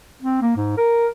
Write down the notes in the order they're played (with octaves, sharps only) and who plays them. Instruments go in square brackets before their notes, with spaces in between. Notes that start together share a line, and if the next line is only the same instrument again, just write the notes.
[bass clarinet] C4
A#3
G#2
A#4